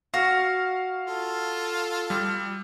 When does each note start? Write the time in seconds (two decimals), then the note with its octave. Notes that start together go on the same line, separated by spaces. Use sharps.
0.14 F#4 F5 C#6 F6 A#6
1.07 F4 A4
2.10 G3 E6 F6